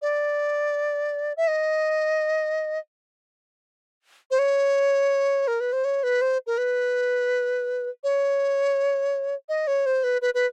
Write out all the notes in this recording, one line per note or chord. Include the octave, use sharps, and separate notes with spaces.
D5
E5
D#5
C5
C#5
A#4
B4
C5
C#5
B4
C5
A#4
B4
C#5
D#5
C#5
C5
B4
B4
B4